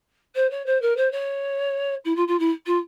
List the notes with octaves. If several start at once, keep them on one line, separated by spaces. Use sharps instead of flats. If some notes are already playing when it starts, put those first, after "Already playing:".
C5
C#5
C5
A#4
C5
C#5
E4
F4
F4
E4
F4